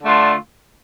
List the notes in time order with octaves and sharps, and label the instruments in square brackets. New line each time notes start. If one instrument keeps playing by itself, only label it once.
[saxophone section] D3 A3 D4 F4